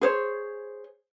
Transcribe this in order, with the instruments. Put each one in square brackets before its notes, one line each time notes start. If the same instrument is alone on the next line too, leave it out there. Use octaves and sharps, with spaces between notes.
[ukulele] G#4 C5 C#5